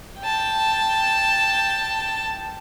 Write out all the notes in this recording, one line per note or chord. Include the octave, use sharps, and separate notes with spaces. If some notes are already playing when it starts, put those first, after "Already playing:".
G5 A5